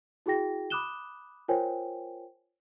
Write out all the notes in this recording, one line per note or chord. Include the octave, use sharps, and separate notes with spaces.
E4 F#4 G#4 G5 A#6
B5 D6 D#6 F#6 E7 G7
F4 A#4 C5 C#5 G5 G#5